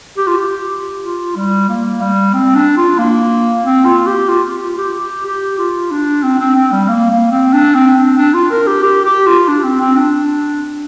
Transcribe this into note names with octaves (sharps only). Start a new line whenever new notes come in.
G4
F4
G4
F4
G3
A#3
G3
C4
D4
F4
A#3
C4
F4
G4
F4
F4
G4
G4
G4
F4
D4
C4
C4
C4
G3
A#3
A#3
C4
D4
C4
C4
D4
F4
A#4
G4
G4
G4
F4
D4
C4
C4
D4